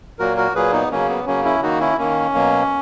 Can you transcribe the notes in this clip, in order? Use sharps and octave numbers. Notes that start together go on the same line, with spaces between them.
A#2 F#3 A#3 F#4 A#4
F#4 A#4
A#2 F#3 A#3 G#4 B4
B3 D#4
C#3 F#3 A#3 C#4
B3
C#3 F#3 A#3 C#4
C#4 E4
D#3 A#3 D#4 F#4
C#4 E4
D#3 A#3 C#4
B2 F#3 A#3